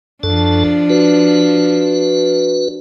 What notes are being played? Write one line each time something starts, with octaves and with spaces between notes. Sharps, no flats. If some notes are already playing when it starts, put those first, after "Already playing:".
F#2 F3 D4 A4 A5
F#4 B4